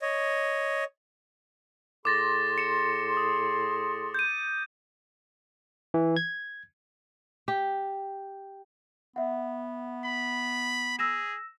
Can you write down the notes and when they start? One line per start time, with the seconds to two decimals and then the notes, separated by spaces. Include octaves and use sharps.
0.02 C#5 D#5
2.05 A2 G#4 C6 D6 A6 A#6
2.58 C#7 E7
3.17 D#6
4.14 G6 D#7
5.94 E3
6.16 G#6
7.48 G4
9.16 B3 E5 F#5
10.05 B5
10.99 G#4 E6 A#6 E7